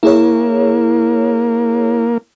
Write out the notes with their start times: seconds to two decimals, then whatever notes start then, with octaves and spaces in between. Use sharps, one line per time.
0.03 A#3 E4 G#4 C#5